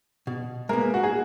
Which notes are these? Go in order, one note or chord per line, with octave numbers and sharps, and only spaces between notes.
B2
G#3 A#3 B3 A#4
F#4
G#4